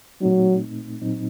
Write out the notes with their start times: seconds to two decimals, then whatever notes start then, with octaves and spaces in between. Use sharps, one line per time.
0.21 A#2 F#3 A3 C4 D#4
1.02 A#2 F#3 C4 D#4